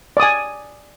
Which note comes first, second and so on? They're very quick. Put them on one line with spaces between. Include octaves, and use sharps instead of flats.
D5 D#6 G#5